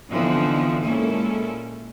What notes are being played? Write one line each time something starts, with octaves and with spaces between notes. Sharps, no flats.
D3 E3 F3 B3 C4 D#4
A#2 G#3 A#3 C#4 E4 A4